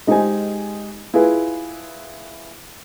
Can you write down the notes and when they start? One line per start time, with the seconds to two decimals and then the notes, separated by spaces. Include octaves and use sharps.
0.07 G#3 D#4 G4 G#4 C5 G#5
1.14 E4 F4 G#4 B4